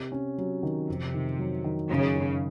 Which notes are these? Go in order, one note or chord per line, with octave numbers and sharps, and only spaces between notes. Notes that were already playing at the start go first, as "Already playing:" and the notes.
Already playing: C3
C#4
F#3
D#3
F2 C3
D#3
F#3
D#3
F#2 C#3
F#2